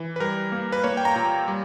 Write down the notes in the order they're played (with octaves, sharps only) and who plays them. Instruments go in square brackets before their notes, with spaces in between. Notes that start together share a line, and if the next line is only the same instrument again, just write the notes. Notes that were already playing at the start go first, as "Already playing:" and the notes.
Already playing: [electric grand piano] E3
B4
G3 A#4
A#3
B4
A#3 C#5
G5
A#5
A#2
G3